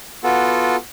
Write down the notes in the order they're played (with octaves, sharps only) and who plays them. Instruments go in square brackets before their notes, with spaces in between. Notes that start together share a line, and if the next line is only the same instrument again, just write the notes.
[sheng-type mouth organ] B3 F4 F#4 A4